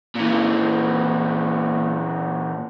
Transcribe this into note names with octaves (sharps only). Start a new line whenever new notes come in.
A#2 E3